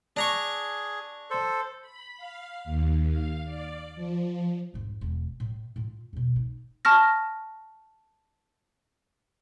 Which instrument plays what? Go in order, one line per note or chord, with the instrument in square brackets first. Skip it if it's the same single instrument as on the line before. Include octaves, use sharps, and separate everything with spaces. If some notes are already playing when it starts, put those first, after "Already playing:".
[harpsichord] D4 A#5 C#6 [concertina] G#4
[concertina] A4 C5
[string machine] B5
F5
D#2
F5
D5
F3
[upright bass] F2 G#2
E1
A2
A2 F4
E2 B2
D#4
[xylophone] A5 C#6 F6 A#6